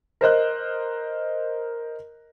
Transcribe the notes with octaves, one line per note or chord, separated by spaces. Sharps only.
A#4 C5 D#5 F#6